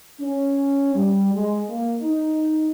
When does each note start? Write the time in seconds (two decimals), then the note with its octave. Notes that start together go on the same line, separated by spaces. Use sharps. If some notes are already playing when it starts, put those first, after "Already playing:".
0.21 C#4
0.95 G3
1.34 G#3
1.69 A#3
2.01 D#4